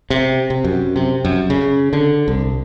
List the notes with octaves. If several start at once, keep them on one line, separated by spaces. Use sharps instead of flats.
C3
C3
F#2
C3
F#2
C#3
D3
C2